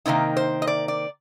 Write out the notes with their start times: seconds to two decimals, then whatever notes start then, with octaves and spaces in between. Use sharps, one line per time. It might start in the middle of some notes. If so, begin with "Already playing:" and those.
0.06 C3 D#3 A#3 D#4
0.37 C5
0.62 D#5
0.67 D5
0.88 D5